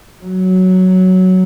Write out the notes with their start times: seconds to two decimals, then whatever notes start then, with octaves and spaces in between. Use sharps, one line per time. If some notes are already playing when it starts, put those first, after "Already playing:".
0.25 F#3